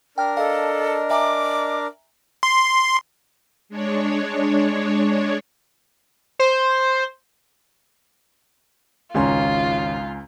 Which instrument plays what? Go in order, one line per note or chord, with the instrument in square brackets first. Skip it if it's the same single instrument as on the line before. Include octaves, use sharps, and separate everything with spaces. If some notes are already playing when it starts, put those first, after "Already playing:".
[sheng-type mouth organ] D4 A#4 [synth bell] G5 F6
[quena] A4 [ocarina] D#5 [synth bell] F5
[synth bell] E5 G#5 A#5 [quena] D6
[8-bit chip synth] C6
[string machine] G#3 D4 C#5
[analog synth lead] C5
[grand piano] G#1 C#4 C6 [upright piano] C#2 G#5 A#5 [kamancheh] F4